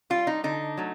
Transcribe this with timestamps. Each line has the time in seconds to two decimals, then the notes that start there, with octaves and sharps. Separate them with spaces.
0.10 G3 F4
0.27 D#4
0.44 D3 D#4
0.77 F#3 A3